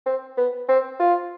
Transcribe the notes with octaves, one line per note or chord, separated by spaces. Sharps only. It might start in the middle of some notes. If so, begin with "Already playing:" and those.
C4
B3
C4
F4